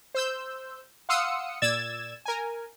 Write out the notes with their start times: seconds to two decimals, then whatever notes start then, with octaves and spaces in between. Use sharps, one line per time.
0.15 C5 E6 G6
1.09 F5 F#5 C6 D#6 E6 C#7
1.62 A#2 D5 E6 G#6 A6 E7
2.25 A#4 G#5